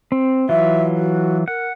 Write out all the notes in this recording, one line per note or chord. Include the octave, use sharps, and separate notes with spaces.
C4
E3 F#3 F4 E5
F#4
A#4 F#5